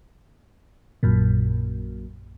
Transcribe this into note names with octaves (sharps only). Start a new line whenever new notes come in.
A#1 F#2 A#2